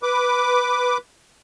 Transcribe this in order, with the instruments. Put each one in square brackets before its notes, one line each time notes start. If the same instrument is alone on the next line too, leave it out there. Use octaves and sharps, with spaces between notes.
[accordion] B4 D6